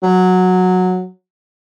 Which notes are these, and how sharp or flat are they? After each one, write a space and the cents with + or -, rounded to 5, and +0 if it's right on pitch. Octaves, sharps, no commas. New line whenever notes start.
F#3 -10